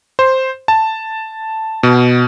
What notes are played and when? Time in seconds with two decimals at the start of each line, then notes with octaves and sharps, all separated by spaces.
0.19 C5
0.68 A5
1.83 B2